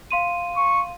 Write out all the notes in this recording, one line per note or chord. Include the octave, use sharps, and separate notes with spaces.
F5 C6 D#7
C#6